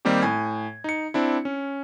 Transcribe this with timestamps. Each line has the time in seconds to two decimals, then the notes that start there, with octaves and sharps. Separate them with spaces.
0.05 D#3 G3 A#3 C4 D#4 G4
0.22 A2 G#5 G#6
0.84 D#4 C#7
1.14 C4 D4 E4
1.45 C#4